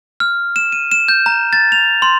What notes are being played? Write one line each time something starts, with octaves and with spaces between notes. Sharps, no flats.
F6
E7
D#7
E7
G6
A#5
A6
F7
C6